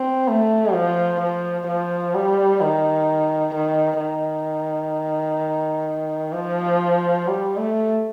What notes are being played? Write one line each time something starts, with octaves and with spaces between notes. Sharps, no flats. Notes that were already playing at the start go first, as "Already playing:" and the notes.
Already playing: C4
A3
F3
F3
F3
G3
D#3
D#3
D#3
F3
G3
A3